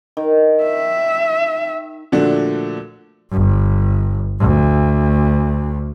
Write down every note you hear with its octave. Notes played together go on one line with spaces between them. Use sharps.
D#3
E5
A#2 D3 F3 A3 D4 F#4
G1
D2